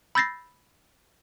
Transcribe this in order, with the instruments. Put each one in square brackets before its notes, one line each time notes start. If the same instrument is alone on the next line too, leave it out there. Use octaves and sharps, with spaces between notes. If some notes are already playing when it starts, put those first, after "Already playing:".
[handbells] B5 E6 G6 A6 A#6 C7